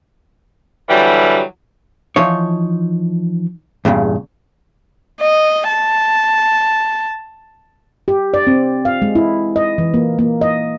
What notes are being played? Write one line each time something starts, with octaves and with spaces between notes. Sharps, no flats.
D3 E3 F#3 G3
E3 F3 D#4 C#5
E2 G2 A#2 C#3
D#5
A5
G4
D5
C4
F5
G#3
E4
D#5
E3
A#3
A#3
D#5